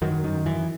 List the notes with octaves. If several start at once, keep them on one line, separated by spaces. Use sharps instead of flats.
F#2 D#3 F#3
F#2 D#3
F#2 E3